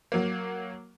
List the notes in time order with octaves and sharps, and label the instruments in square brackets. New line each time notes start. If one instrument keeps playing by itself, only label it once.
[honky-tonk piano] F#3 A#3